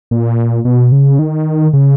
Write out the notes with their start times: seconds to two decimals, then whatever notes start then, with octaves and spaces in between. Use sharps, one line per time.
0.11 A#2
0.65 B2
0.92 C#3
1.19 D#3
1.73 C#3